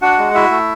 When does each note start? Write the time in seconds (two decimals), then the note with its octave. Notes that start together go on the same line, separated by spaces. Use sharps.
0.02 D4 F#4 F#5
0.18 G#3
0.34 E4 F#4 E5
0.51 A3